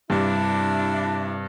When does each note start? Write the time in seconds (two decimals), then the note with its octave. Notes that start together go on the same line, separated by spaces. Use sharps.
0.10 G2 C3 D4 E4